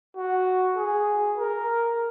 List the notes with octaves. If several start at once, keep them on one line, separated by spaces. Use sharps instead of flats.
F#4
G#4
A#4